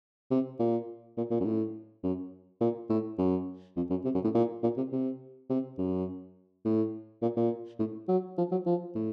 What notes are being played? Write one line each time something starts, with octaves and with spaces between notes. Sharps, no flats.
C3
A#2
A#2
A#2
F#2
A2
F#2
A#2
A2
F#2
F2
F#2
C3
F#2
A2
A#2
A#2
C3
C3
C3
F#2
A2
A#2
A#2
A2
F#3
F3
F#3
F3
A2